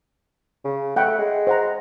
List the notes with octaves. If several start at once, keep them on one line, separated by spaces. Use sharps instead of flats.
C#3
A3 F#5 G5 B5
G#3
C5 F#5 A#5